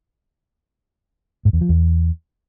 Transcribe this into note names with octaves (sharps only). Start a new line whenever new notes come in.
G#2
E2
F3
E2